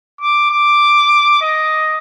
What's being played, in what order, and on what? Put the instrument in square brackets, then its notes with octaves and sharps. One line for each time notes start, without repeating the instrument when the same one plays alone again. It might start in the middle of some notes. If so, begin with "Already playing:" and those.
[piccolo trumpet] D6
D6
D#5